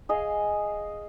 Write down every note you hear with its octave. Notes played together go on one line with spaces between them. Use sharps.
G#4 D#5 F5